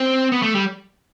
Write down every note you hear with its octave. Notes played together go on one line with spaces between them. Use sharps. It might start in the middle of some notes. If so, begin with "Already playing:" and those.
Already playing: C4
B3
A3
G3